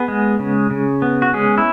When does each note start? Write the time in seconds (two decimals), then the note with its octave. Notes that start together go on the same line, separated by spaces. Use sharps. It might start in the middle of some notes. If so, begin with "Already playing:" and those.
Already playing: B3 G#4
0.08 G#3
0.39 C#3
0.71 C#3
1.02 B3
1.22 F#4
1.33 G#3 C#4 G#4
1.58 E4